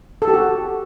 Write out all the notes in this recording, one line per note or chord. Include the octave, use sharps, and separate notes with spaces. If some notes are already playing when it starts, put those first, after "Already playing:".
A4
G4
F#4